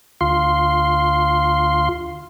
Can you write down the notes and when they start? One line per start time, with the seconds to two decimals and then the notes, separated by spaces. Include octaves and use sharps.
0.21 D2 F4 C6